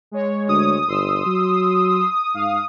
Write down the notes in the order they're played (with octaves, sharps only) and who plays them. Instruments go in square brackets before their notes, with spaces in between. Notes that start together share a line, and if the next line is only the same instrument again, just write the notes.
[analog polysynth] G#3 C#5
[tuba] D2 [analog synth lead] D#6
[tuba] G1 [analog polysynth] C6 E6
[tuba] F#3
[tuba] G#2 [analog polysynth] F5